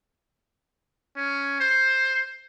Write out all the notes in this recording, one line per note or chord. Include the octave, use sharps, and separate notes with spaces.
C#4
C5